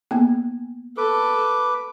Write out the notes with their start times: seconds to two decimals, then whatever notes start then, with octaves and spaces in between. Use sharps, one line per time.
0.11 A#3 B3
0.97 A4 B4 D6